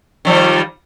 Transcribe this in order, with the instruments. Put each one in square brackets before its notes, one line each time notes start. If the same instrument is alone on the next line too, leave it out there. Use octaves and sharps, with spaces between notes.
[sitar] D#3 F3 G3